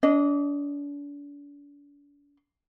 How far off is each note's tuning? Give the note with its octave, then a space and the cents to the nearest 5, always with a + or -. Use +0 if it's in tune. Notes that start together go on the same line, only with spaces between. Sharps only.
D4 -40 D#5 +0